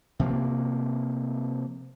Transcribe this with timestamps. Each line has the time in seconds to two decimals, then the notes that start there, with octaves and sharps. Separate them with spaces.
0.19 C3 F3 A#3